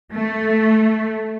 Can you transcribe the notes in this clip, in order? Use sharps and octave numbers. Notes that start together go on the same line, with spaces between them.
A3